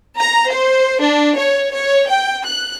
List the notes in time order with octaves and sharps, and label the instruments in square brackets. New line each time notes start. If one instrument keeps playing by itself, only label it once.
[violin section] A#5
C5
D4
C#5
C#5
G5
F#6